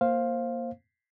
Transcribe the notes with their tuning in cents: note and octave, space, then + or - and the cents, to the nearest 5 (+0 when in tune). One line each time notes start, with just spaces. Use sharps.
A#3 +0 C5 +15 F5 +0